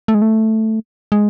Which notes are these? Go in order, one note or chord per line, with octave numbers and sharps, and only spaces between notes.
A3
G#3
A3
G#3